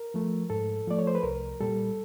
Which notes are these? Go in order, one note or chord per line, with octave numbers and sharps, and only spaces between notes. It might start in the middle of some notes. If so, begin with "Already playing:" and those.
Already playing: A#4
F3 A3
G#2 A4
F3 A3 D5
C#5
C5
B4
C2 A#4
A#2 G3 A4